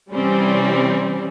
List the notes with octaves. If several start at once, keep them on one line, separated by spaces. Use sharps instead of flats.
C3 E3 G3 C4 C#4